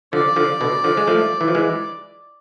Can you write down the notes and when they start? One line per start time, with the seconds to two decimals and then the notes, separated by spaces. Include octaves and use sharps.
0.13 D3 F3 D5
0.36 D3 F3
0.61 B2 D3
0.84 D3 F3
0.97 G#3
1.07 F3 A3
1.41 E3
1.48 F3
1.55 E3 G#3